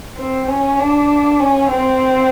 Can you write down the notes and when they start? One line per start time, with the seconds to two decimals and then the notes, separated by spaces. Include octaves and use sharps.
0.17 C4
0.47 C#4
0.79 D4
1.39 C#4
1.70 C4